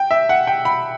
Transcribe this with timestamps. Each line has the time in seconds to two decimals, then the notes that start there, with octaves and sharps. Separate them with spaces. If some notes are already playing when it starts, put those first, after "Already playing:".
Already playing: G5
0.11 E5
0.29 F#5
0.47 G5
0.65 B5